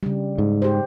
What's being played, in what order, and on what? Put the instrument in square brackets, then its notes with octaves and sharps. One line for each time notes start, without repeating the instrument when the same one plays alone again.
[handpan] C#3 G3
[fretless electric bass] G#2
[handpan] G4 C5